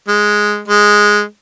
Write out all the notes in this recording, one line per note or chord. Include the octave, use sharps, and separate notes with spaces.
G#3
G#3